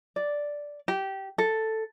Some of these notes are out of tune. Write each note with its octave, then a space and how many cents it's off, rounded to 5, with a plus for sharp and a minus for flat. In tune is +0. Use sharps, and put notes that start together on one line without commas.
D5 -5
G4 -15
A4 +5